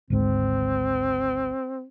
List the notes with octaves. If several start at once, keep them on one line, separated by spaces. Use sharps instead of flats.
G#1 D2 G#2 C4